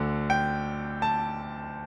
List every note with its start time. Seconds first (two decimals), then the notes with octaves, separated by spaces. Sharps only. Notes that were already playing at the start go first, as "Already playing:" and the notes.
Already playing: D2 D3
0.30 G5
1.02 A5